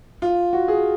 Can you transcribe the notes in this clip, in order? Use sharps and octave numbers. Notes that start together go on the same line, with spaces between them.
F4
F#4
G#4